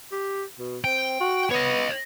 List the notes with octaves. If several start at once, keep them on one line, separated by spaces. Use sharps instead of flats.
G4
B2
C4 G5
F#4
B3 C#5 D#5